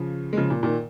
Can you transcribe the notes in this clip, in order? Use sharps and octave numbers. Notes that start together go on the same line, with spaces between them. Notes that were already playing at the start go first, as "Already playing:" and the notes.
Already playing: C#3 F3
G#3
C#3 F3
A#2
A#2 D#3